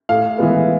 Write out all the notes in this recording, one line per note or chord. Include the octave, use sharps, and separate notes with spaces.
A2 F5
E3 G#3 B3